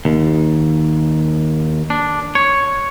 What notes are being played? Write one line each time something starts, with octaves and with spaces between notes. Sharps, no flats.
D#2
D4
C#5